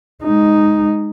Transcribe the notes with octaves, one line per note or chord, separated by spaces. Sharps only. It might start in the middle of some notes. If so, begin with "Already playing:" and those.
G#3 D#4